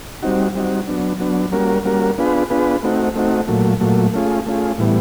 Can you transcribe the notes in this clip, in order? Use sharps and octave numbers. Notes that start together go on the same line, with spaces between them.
G3 C4 D#4 F#4
G3 C4 D#4 F#4
F#3 B3 D4
F#3 B3 D4
G3 A#3 C#4 F#4 A#4
G3 A#3 C#4 F#4 A#4
B3 D4 F4 G#4 B4
B3 D4 F4 G#4 B4
A3 C4 D#4 F#4
A3 C4 D#4 F#4
A#2 F#3 A3
A#2 F#3 A3
A3 C#4 F4 G#4
A3 C#4 F4 G#4
A2 E3 G3 B3